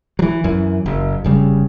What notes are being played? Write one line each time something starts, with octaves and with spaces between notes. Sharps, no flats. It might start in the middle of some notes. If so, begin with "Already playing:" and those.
E3 F#3
F#2 E3
F#1
F1 C#3 G3